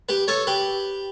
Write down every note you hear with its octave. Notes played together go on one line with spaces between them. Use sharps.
G4 B4
A4 C#5
G4 B4